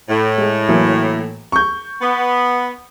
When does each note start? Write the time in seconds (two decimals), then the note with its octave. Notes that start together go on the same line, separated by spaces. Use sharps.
0.09 A2
0.38 G#3
0.69 E3 F#3 A#3
1.52 C#6 G6
2.02 B3